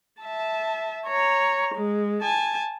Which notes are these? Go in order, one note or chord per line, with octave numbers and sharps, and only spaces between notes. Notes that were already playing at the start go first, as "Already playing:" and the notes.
E5 A5
C#5 A#5
G#3
G#5 A5